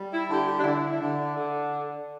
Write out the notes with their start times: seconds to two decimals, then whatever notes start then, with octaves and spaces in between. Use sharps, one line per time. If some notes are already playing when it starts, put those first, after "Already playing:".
Already playing: G3
0.11 E4
0.29 D3 G4
0.47 G4
0.60 D4
0.64 D3 E4
0.90 E4
0.99 D3 D4
1.35 D3